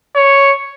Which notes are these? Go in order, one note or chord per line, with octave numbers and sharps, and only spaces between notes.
C#5